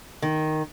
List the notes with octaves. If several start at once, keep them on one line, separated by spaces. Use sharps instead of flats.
D#3